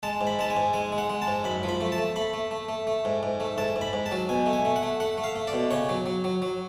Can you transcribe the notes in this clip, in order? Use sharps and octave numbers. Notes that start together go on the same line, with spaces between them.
G#3 A5
G#2
B5
G#3 A5
G#5
G#2
G#3 G#5
G#3
F#5
G#3
A5
G#2
F#2 B5
F3
B5
A3
A5
A3
A3 B5
A3
A3
A3
A3
G#2
G#2
A3
G#2 A5
G#2
B5
G#2
A5
F#3
B2 G#5
A3
G#5
A3
F#5
A3
A3 F#5
A3
F5
A3
D5
B2
C#3 C#5
F#3
F#3
F#3
F#3